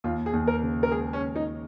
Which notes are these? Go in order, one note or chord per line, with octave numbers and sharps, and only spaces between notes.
D#2 F4
G#4
D#2
A#4
C#3
A#4
G#3 G#4
C#4
D#2
D#4